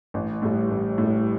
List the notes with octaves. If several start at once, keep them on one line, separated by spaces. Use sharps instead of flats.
A1
A2 G3
A1
A2
G3